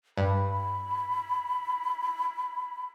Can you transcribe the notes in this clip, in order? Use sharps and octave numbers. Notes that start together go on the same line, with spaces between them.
G2 B5